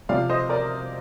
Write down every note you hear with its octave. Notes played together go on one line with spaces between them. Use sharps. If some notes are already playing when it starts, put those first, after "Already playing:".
C3 F3 D5 F5
C5 D#5
A#4 D5